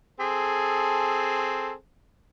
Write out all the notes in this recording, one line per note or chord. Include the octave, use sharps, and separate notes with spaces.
C4 G#4 A4